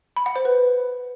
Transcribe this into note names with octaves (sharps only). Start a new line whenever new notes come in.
B5
F#5
C5
B4